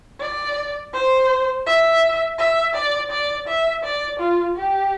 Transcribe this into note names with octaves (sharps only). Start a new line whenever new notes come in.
D5
C5
E5
E5
D5
D5
E5
D5
F4
G4